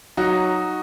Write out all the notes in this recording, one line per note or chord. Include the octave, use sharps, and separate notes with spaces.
F#3 D#4 F#4